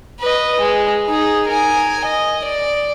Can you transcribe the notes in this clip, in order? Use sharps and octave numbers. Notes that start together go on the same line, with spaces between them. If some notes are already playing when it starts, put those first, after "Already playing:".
B4 D#5
G#3
D#4 G#4
A#4 G#5
D#5
D5